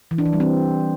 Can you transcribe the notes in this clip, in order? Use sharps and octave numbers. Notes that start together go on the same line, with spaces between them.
E3
D4
E3
G3
C4